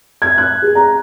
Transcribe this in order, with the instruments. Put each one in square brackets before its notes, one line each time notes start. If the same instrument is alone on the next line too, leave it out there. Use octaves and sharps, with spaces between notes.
[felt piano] G#6
F#6
G#4
A#5